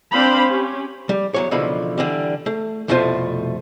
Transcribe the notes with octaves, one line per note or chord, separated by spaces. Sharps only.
C4 D4 C5 F5 B5
C#4 G4
G3
E2 F#3 C#5
C#2 B2 D3 E3 F3 B5
D3 E3 G3
A3
C2 F2 B2 A3 F4 C5